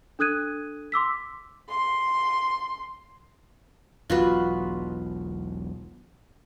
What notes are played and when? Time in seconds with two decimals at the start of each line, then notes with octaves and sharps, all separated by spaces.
0.19 D4 A4 D#6 F#6 G#6 D#7
0.92 C6 D6 E6 B6
1.69 C6
4.10 E1 B1 F4 F#4 B4